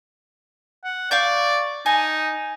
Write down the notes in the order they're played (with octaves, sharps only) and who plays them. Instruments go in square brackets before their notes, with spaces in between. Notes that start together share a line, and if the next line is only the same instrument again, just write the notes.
[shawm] F#5
[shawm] D5 [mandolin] F5 C#6 G6
[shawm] D#4 [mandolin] G#5